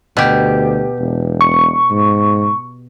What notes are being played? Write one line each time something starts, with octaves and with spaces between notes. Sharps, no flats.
D2 B2 G4
E1
C#6
G#2